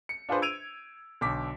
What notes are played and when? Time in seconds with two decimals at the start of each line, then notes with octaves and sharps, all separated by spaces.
0.09 C#7
0.29 D4 F4 G#4 B4 C5
0.42 E6 G#6 D7 D#7 F7
1.21 B1 D3 D6 B6